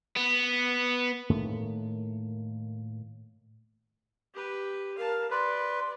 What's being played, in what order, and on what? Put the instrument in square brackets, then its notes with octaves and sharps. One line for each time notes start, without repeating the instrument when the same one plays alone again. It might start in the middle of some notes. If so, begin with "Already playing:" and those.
[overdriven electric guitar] B3
[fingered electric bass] A2 D#3 A3 A#3
[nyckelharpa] G4 B4
[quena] A#4 [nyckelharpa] F5 A5
[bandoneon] B4 [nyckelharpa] D5 [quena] C6